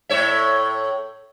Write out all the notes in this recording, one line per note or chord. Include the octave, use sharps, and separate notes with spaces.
A2 C#5 E5